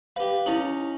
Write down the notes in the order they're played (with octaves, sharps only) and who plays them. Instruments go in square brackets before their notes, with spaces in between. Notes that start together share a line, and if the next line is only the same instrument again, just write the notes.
[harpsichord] G4 B4 [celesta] F5
[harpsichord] C#4 D#4 [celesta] E4 F#7